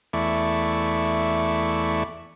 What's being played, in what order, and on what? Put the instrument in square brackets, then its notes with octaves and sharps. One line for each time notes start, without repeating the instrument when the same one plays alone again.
[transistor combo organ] E2 A3 E4 D5 C#6